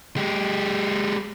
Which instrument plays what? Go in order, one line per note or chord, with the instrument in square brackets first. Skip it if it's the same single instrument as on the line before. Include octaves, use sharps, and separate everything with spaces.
[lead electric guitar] G#3 G4